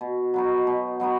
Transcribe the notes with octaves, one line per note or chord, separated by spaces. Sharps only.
B2
F#3 B3 D#4
B2
F#3 B3 D#4